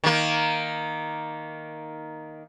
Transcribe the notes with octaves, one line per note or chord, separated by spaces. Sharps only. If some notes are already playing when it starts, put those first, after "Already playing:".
D#3 A#3